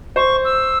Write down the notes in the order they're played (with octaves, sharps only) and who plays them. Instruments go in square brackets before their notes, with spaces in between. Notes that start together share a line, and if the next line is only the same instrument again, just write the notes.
[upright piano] C5 [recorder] C#6
[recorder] E6